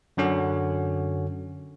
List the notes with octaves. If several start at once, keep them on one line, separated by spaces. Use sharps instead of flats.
F#2 D3 C#4 F#4